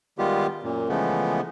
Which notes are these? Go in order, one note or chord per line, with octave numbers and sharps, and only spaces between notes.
D#3 G3 G#3 B3 F4 G4
F#2 A#2
C#3 E3 F3 G#3 A3 B3